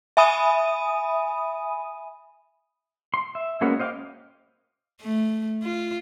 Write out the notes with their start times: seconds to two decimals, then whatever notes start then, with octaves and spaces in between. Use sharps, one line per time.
0.17 E5 G#5 B5 D#6 D#7
3.14 C6
3.35 E5
3.61 G#3 A#3 B3 C#4 F#4
3.79 C5 D#5 F5 G5 D6
5.01 A3
5.63 F4